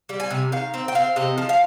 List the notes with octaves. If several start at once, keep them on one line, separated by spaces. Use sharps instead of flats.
G3
G#5
C3
D#3 F5
C4
G5
C4 F5
C3 D#5
F3
F5